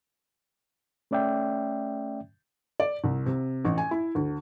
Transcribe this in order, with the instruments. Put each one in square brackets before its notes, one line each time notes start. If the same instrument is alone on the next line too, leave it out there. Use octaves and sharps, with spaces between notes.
[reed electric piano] A3 C#4 D5 E5 G5
[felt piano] D5
C2
C3
A1
G#5
E4
D2